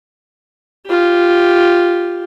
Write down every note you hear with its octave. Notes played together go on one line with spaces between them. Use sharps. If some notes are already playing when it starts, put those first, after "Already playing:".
F4 G4